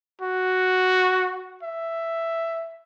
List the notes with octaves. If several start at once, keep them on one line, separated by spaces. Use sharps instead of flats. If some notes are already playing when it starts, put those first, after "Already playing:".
F#4
E5